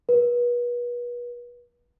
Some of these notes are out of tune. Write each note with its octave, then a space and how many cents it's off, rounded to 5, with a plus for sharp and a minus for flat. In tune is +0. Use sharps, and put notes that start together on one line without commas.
B4 -35